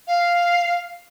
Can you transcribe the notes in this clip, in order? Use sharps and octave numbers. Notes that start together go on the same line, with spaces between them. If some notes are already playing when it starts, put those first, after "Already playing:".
F5